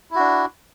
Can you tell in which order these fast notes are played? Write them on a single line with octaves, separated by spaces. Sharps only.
E4 F#4 D4